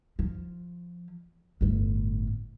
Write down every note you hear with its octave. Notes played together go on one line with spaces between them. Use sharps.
F3
G1 A2